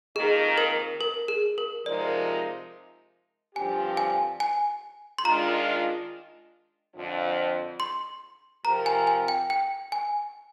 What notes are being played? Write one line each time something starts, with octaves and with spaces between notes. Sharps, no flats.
F2 D#3 A#3 D#4 G#4
A#4
A#4
G#4
A#4
C3 F3 G#3 D#4 A#4 D5
G2 D3 F3 C4 G4 G#5
G#5
G#5
C6
D#3 G#3 D4 F4 A#5
F2 D3 F3
C6
C3 F3 C4 G4 A#4 A#5
G#5
G#5
G5
G5
G#5